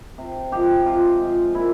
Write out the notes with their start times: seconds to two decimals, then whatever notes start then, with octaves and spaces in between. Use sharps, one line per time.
0.18 C3
0.52 F3 G#3 G4
0.85 C3 F4
1.21 F3 G#3
1.54 A#2 E4